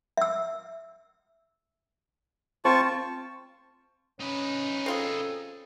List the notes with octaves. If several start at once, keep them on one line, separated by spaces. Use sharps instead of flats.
E5 E6
C4 F4 A5 C#6
C#4 D#4 B4
C4 F4 G#4 A4